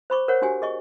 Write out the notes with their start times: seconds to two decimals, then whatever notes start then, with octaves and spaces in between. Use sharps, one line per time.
0.10 C5 B5 C#6 D6
0.28 A#4 C5 C#5 F#5
0.42 D4 F#4 G4 G#5
0.62 G#4 D#5 C#6